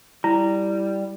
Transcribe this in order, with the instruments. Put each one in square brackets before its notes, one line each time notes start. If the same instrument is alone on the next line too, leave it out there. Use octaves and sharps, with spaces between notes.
[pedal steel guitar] G3 [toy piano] E4